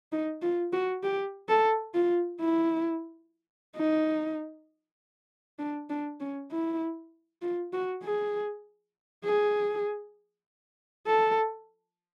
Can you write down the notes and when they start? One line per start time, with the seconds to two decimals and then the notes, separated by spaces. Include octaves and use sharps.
0.12 D#4
0.42 F4
0.72 F#4
1.03 G4
1.49 A4
1.94 F4
2.40 E4
3.76 D#4
5.59 D4
5.90 D4
6.20 C#4
6.51 E4
7.42 F4
7.73 F#4
8.03 G#4
9.25 G#4
11.07 A4